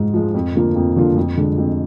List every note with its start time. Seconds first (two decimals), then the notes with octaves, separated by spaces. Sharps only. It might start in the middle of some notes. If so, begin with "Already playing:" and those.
Already playing: G#2 F3 G#3
0.14 F3 G#3
0.34 F2
0.55 D3 F3 A#3 F4
0.76 F2
0.96 D3 F3 A#3 F4
1.17 F2
1.37 D3 G#3
1.58 F2